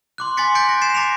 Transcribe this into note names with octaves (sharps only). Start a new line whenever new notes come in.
C6 D6 F#6
G#5 C6 D6 A6 B6 C#7
D6 F#6 G6 B6 C#7 D7
A#6
A6 C7 C#7 E7
A#5 D6 A#6 D7 F7